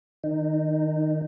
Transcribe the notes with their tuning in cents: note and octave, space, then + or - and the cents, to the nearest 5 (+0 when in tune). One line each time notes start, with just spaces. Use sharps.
D#3 +0 D#4 -20